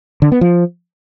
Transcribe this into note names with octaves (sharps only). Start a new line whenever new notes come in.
D3
B3
F3